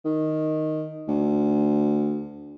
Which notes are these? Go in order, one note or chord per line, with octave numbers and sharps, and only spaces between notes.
D#3
D2